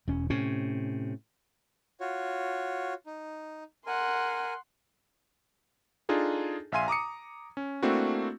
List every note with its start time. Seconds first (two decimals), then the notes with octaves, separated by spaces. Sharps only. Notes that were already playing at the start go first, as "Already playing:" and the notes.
0.08 E1 C#4
0.30 A2 C3 C#4
2.01 F4 F#4 C#5
3.06 D#4
3.86 A#4 F#5 G#5 C6
6.09 D4 D#4 F4 G#4 A4
6.72 A#1 E5 F5 G#5 C6 D#7
6.88 A#5 D6 D#6 C#7
7.57 C#4
7.83 A3 A#3 C4 D4 E4 F#4